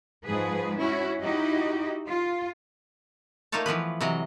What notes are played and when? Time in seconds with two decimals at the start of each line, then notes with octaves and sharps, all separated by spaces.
0.25 G#2 F3 G#4 B4
0.77 C#4 E4 F#4
1.21 D#4 E4 F#4 G4 D#5
2.07 F4
3.52 A3 A#3 D#4 F4 C#5 A5
3.66 E3 F3 B3 B4
4.01 C3 E3 F#3 D#5